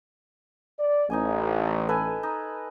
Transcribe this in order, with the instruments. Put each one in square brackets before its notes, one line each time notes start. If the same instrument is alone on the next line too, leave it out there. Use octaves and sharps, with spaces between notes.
[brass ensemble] D5
[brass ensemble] A1 [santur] D#4 D#5 G#5
[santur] A4 B4 G#5
D#4